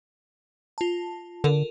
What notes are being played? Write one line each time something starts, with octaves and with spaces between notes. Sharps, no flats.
F4 A5
D3 A4 A#4